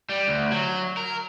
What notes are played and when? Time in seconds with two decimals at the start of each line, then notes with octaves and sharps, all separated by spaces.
0.09 G3
0.28 D2
0.52 F#3
0.97 A#4